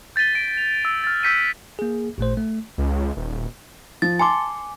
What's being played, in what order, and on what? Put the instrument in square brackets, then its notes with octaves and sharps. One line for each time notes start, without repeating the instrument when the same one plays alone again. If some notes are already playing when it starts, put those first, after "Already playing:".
[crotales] G6 A6 B6 D#7 G7
D7
F7
E6
F6 A6
E6 F#6 G6 B6 C#7 D#7
[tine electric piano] A#3 G#4
A1 A#2 A3 C5
A3
[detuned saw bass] C#2
D#1
[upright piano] F3 [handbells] A6
[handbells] G#5 D6 [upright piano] A5 C6